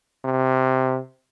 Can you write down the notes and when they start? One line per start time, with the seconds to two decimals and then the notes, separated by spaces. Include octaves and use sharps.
0.25 C3